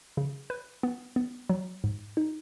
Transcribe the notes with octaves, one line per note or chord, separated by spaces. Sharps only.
C#3
B4
B3
B3
F#3
G#2
D#4